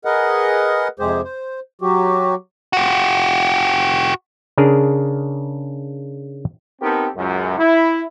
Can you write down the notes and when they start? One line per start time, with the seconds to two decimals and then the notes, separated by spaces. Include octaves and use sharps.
0.05 G#4 A#4 B4 D#5 F#5
0.99 F2 C3 G#3 G4 G#4 C5
1.24 C5
1.81 F#3 F#4 G4
2.73 F#4 G4
4.58 C#3 D4 G#4 A#4
6.82 B3 C4 D#4 G4 A4 A#4
7.17 C#2 F#2
7.59 E4